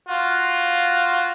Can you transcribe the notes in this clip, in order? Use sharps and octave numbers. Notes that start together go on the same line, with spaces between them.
F4 F#4